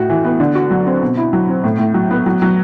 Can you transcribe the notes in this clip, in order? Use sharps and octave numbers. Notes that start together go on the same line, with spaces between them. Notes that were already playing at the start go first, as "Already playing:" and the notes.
Already playing: A2 F#4
E3
B3
D3
F#4
F#3
C4
B2
E4
F#3
C4
A2
A2
F#3
B3
F#3
F#3